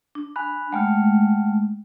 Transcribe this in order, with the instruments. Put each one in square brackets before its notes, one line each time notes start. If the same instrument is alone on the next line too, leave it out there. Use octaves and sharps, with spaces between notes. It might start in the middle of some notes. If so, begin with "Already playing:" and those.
[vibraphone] D4
[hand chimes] G#5 B5 F#6
[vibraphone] G#3 A3 [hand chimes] F#5 G5 F6